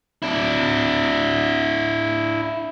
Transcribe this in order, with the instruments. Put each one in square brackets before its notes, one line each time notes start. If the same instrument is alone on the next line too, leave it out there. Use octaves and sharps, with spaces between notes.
[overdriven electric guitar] D4 E4